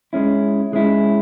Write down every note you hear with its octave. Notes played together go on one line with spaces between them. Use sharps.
G#3 C#4 E4
G#3 C#4 E4